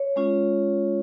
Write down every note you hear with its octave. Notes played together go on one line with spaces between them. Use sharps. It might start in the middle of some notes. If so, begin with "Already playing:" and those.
Already playing: C#5
G#3 C#4 F4